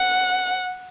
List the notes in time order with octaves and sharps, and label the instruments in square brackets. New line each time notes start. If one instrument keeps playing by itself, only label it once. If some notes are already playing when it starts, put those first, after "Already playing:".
Already playing: [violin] F#5